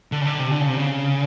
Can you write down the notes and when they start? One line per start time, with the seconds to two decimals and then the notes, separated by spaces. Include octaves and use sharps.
0.12 D3
0.21 C#3
0.26 D3
0.39 C3
0.52 D3
0.61 C#3
0.69 C3
0.78 C#3